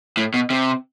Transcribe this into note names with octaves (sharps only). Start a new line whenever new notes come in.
A2
B2
C3